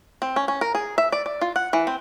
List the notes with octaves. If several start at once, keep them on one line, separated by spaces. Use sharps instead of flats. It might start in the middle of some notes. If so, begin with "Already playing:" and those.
C4
C#4
C#4
A#4
G#4
E5
D5
D5
F4
F#5
E3
C4